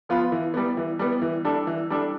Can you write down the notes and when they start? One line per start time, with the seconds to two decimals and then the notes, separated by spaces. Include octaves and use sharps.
0.09 F3 B3 F4 B4
0.32 E3
0.54 G3 B3
0.77 E3
0.99 G3 B3
1.22 E3
1.45 G3 D4 A4
1.67 E3
1.90 G3 D4 A4